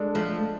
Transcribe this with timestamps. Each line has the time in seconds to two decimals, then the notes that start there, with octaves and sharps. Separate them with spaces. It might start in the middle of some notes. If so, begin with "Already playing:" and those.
Already playing: G#3 D4 A4
0.15 F3 A3